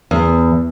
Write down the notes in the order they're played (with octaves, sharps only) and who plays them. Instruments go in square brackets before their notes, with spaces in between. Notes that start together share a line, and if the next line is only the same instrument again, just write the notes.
[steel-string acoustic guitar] E2